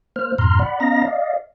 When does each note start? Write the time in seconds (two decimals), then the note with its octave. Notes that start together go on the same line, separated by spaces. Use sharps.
0.16 A#3 C5 F6
0.38 F2 G#2 B2 A#5 C6 F6
0.60 D5 F#5 B5
0.80 B3 C#4 D#5 F5 A#5 A#6
1.04 D5 D#5 F5